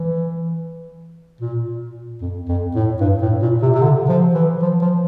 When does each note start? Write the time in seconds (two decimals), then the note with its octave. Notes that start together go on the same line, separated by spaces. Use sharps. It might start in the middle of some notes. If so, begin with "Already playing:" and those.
Already playing: E3
1.41 A#2
2.21 F2
2.49 F2
2.75 A2
3.01 G2
3.22 A2
3.42 A#2
3.62 C3
3.75 C3
3.82 D3
4.09 F3
4.35 E3
4.62 F3
4.82 F3